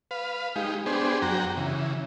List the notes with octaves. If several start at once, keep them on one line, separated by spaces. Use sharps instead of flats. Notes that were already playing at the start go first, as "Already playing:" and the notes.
B4 F5
G#3 D#4 G4
B3 D4 G4 G#4 C5
F#2 F#4 G5 A#5
C#3 E3